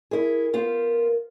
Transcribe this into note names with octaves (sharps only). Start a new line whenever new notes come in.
E4 G#4 A#4
B3 F4 C5